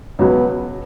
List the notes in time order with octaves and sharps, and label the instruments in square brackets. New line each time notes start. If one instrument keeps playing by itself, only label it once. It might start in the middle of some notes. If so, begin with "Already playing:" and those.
[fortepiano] C#2 B2 F#3 [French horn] B3